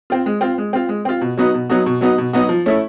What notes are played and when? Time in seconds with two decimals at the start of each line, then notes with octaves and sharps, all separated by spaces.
0.10 C4 F4
0.26 G#3
0.41 C4 F4
0.58 G#3
0.73 C4 F4
0.89 G#3
1.05 C4 F4
1.21 B2
1.37 F#3 B3 D#4 F#4
1.54 B2
1.70 F#3 B3 D#4 F#4
1.86 B2
2.01 F#3 B3 D#4 F#4
2.18 B2
2.33 F#3 B3 D#4 F#4
2.49 F3
2.66 A3 C#4 E4